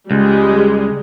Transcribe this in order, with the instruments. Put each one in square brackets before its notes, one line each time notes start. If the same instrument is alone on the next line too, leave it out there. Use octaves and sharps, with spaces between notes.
[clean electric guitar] C#2 [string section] G3 G#3